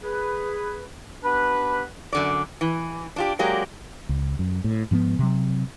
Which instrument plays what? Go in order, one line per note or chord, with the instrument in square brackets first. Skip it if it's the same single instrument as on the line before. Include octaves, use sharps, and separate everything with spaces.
[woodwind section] G#4 B4
B3 D4 G4 B4
[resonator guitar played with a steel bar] F#2 D3 D5
E3
D4 F4 G4
F#3 G#3 A#3 G4 D5
[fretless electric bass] C#2
F#2
A2
G#2 F3 A#3 B3
C3 F#3